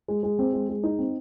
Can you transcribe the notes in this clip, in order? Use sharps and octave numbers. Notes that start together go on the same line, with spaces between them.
G#3
G#3
C4
G#3
G#3
D#4
C4